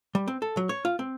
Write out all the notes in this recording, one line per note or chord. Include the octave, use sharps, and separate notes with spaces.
G3
C4
A4
F#3
C#5
F4
C4